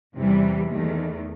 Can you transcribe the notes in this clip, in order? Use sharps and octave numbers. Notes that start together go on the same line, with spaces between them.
E2 C3 E3 G3
E2 D#3 A3